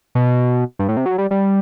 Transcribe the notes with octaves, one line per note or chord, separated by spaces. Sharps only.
B2
G2
A2
C3
F#3
G3
G3